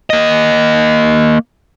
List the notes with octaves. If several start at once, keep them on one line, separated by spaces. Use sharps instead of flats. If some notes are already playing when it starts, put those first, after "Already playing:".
A#3 D#5